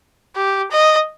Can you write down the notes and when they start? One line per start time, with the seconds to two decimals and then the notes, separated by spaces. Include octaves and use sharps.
0.36 G4
0.71 D#5